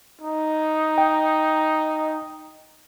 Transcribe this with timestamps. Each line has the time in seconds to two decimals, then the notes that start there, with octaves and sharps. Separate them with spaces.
0.21 D#4
0.98 G5